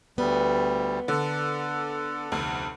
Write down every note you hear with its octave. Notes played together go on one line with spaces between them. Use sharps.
D2 G3 B3
D3 A4
F1 D2